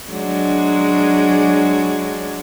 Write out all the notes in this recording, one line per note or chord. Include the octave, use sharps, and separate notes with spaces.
F#3 G#3 D4